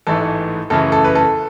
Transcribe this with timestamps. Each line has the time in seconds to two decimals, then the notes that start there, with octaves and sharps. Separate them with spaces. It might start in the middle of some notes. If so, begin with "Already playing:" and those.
0.07 A1 G#2 E3 A3 A4
0.70 F#2 C#3 E3 A3 A4
0.92 A4
1.05 B4
1.15 A4